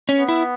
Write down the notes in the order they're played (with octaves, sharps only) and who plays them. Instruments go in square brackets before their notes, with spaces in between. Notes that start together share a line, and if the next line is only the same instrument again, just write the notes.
[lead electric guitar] C#4
[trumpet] B3
[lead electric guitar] E4